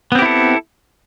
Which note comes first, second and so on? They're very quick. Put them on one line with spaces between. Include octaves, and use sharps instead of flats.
B3 C4 G4 E4 A4